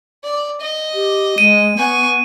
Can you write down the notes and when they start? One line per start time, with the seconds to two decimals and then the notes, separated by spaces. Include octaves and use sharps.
0.24 D5
0.61 D#5
0.94 G4
1.38 G#3 D#7
1.77 B3 G#5 C#6